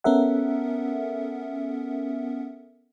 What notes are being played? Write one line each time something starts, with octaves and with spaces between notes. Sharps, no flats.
B3 C#4 A4 A#4 E5 F#5